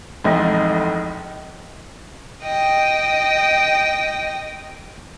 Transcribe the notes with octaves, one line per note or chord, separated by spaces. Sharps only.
A1 F2 G#2 D#4
D#5 G5